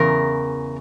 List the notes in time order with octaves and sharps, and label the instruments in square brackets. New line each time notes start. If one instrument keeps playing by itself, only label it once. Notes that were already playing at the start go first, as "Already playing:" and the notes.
Already playing: [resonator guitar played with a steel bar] E2 C#3 A#4